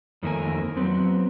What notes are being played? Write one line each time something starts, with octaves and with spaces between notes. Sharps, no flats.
F2 D#3 A3 A#3 A#4 G#5
F#3 B3 C4